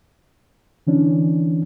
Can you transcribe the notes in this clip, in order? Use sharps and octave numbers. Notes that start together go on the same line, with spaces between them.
D3 E3 C#4 D4